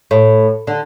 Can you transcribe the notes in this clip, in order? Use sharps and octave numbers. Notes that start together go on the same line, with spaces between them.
A2
D3